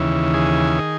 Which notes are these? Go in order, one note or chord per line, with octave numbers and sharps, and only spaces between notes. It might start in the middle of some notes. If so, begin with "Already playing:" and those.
Already playing: D#2 C#3 E3
G#4
D#3